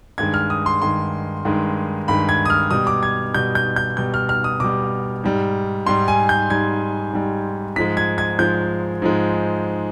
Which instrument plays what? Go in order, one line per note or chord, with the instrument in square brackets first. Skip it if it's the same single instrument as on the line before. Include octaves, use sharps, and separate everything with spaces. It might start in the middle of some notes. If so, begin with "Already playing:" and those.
[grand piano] G2 D#3 G#3 G#6
F6
D#6
C6
G2 D#3 G#3 C6
G2 D#3 G#3
G2 D#3 G#3 B5
G#6
D#6
F6
B2 G3 D#6
D6
G#6
B2 G3 G6
G6
G6
B2 G3 G6
F6
F6
D#6
B2 G3 D6
G#2 G3
G#2 G3 C6
G#5
G6
G#2 G3 G#6
G#2 G3
G#2 F3 G#3 B6
G#6
G#6
G#2 F3 G#3 G6
G#2 F3 G#3